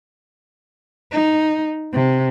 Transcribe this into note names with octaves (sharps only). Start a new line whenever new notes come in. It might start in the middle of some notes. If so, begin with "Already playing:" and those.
D#4
C3